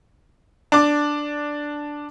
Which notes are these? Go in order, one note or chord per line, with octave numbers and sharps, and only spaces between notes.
D4 D6